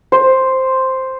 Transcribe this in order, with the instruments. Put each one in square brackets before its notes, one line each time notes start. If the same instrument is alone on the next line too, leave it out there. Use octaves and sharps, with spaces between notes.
[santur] C5